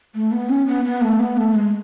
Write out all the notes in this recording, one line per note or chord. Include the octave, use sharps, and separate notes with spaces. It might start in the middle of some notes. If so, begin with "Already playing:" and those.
A3
B3
C#4
B3
B3
A3
B3
A3
G#3